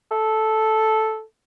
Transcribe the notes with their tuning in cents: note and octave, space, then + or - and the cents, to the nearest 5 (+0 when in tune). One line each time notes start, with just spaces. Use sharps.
A4 -5